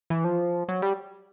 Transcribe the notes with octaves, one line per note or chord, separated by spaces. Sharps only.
E3
F3
F#3
G3